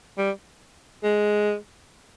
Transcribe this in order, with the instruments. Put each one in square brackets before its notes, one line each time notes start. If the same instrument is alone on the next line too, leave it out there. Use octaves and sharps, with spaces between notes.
[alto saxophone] G3
G#3